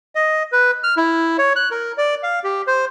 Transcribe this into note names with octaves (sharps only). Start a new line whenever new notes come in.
D#5
B4
F6
E4
C#5
F#6
A#4
D5
F5
G4
C5